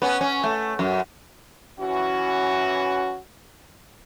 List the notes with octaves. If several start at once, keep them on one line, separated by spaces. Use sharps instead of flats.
B3 C#4
C#4
A3
F#2
E3 C#4 F#4